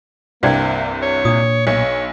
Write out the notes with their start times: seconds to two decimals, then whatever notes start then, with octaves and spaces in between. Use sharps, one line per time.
0.43 C2 G2 C3 A#3 C5 D5 G5
1.02 C#5
1.25 A#2 D4 D#6
1.67 B1 C#5